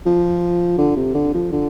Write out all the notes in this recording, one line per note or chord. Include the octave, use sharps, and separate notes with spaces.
F3
D3
C3
D3
F3
D3